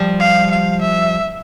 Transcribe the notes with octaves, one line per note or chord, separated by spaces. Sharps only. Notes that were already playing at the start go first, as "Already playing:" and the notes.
Already playing: F3 G3
F5
F5
E5